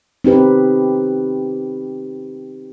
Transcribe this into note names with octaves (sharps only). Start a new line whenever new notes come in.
C4 D#4 G4 B4